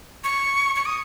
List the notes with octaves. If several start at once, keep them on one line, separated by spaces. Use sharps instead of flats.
C#6
C#6
D#6